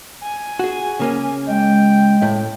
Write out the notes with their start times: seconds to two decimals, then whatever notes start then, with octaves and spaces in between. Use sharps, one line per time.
0.23 G#5
0.59 F#4 G#4
1.00 C#3 A#3 C#4
1.48 G#3 G5
2.22 A2 E4